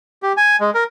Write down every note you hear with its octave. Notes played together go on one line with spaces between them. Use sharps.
G4
G#5
G#3
A#4